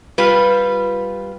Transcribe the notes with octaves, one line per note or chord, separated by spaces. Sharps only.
G3 F4 B4